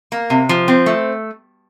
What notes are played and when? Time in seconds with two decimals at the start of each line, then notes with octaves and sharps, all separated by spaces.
0.12 A#3
0.30 C3
0.49 F3
0.68 C4
0.86 A3